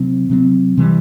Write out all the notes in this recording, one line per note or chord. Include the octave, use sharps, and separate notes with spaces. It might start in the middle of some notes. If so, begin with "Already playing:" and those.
Already playing: C3 F#3 C4
C3 F#3 C4
C3 E3 G3